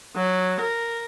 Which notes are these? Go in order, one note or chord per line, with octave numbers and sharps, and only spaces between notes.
F#3
A#4